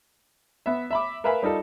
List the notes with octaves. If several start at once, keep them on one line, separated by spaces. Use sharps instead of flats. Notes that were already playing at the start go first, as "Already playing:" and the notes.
B3 E5
E5 B5 D6
A#4 B4 E5 F5 G#5 B5
G3 D#4 F4 A4